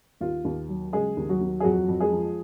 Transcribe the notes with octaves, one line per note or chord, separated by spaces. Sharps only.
D#2 F4
D#2
F#3
C#3 G#3 G#4
D#2
F#3 F#4
D#2
G#4
F2 F#3 F#4
F2
G#3 G#4
F3